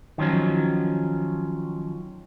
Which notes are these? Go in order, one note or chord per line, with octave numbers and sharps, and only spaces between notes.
D#3 F3 F#3 C#4